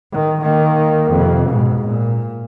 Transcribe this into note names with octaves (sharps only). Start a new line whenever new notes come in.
D#3
D#3 A#3
F2 C3
G#2 B2
A#2